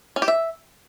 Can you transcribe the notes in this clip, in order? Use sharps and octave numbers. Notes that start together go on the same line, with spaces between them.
C#4
G4
E5